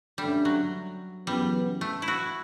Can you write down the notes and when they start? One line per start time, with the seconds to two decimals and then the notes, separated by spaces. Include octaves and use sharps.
0.18 G2 D3 G3 A3 C#4
0.45 F#3
1.26 F#2 C#3 E3 G3 B3
1.81 A3
2.02 E4
2.08 F#4